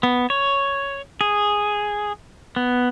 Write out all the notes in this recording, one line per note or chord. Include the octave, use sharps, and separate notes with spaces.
B3
C#5
G#4
B3